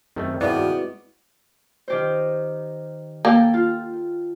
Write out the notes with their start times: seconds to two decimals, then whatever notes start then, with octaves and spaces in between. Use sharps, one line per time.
0.16 F#2 D#3 A3 C4
0.41 G2 B2 D#3 G#3 B3 E4 D5
0.56 F#4
1.88 D#3 G4 C5
3.25 A#3 A4 G5
3.54 F4